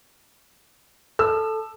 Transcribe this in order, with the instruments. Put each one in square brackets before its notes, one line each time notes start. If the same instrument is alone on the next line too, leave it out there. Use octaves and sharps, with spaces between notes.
[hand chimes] A4 [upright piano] E6